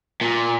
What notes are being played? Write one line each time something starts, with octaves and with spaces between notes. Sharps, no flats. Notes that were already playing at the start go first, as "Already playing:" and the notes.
A#2